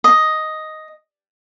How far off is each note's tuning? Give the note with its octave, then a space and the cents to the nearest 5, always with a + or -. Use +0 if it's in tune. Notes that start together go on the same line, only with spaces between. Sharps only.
D#5 +5